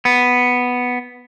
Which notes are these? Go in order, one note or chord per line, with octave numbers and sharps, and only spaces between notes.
B3